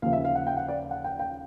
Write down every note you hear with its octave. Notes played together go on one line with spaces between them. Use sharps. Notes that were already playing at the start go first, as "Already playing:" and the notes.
D#2 C#3 F3 F5
E5
F5
F#5
G5
F#5
D5
F#5
G5
G5